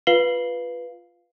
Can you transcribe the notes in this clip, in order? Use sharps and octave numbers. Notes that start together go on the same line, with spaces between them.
F4 B4 F5 C7 F#7 G7